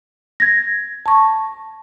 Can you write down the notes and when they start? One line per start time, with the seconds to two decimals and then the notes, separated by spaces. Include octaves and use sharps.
0.40 G#6 A#6
1.06 A5 C#6